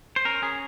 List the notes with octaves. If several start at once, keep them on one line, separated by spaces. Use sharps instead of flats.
C5
C#4 A#4
C#4 G#4